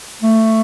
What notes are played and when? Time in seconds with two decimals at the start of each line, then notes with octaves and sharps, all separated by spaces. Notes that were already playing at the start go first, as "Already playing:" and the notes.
0.22 A3